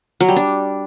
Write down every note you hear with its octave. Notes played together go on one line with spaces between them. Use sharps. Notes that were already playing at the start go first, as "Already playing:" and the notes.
F#3
G3
D4